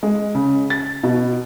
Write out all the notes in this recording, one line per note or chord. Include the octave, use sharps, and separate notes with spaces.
G#3
C#3
A6
B2